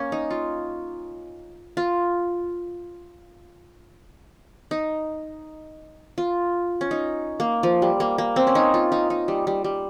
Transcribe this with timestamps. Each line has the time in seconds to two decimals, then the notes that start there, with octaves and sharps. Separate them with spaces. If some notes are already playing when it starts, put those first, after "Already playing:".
Already playing: A#3 C#4
0.12 D#4
0.30 F4
1.77 F4
4.71 D#4
6.18 F4
6.81 C#4
6.91 D#4
7.40 A#3
7.63 F3
7.82 G3
8.00 A#3
8.18 A#3
8.36 C4
8.47 C#4
8.55 D#4
8.74 F4
8.92 D#4
9.10 D#4
9.28 G3
9.47 G3
9.64 G3